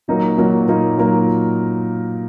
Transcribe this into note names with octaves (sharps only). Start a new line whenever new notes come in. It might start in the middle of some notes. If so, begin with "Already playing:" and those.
A#2 F#3 A#3 D#4 A#4
A#2 F#3 A#3 D#4 A#4
A#2 F#3 A#3 D#4 A#4
A#2 F#3 A#3 D#4 A#4